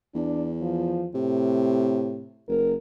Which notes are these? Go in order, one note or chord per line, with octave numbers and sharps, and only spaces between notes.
E2 D4
F3
A2 C3
F#1 A#4